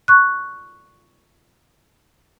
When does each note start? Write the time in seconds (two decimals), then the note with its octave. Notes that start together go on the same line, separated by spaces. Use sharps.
0.08 C#6 F#6